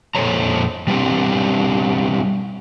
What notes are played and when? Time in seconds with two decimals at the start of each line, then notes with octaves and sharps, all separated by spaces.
0.15 F2 A#2 A4 C5 C#5 A#5
0.87 B2 G3 B3 C4 D4 G4